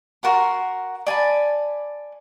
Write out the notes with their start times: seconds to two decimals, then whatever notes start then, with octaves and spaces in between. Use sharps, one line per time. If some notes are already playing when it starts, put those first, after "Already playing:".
0.23 F#4 A#4 F#5 C6
1.07 D5 G#5 A5 B5